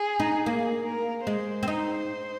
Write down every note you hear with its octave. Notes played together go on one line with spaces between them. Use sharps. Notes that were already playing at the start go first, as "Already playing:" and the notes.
Already playing: G#4
D#4
A#3 G#4
A#4
G#3 C5
C4
D#4